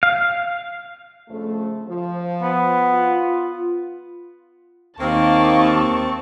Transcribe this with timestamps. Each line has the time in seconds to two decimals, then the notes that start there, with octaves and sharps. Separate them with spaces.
0.03 F5
1.28 F2 C#3 A3
1.86 F3
2.42 B3
2.93 F4
5.00 D#2 A#3 C4 A5 C#6